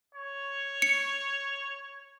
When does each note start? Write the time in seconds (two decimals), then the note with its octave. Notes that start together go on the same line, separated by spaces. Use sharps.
0.15 C#5
0.82 C#7